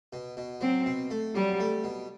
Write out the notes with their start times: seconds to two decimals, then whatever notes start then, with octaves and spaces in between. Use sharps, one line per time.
0.13 B2
0.37 B2
0.61 F#3 C4
0.86 B2
1.11 A3
1.35 F#3 G3
1.60 A3
1.84 B2